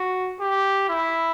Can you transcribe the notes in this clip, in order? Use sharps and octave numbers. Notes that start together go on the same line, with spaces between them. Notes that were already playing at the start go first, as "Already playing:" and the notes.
Already playing: F#4
G4
E4